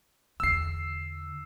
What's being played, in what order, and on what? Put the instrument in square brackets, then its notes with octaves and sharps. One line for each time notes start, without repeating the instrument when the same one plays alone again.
[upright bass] E2 D3 [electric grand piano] E6 C7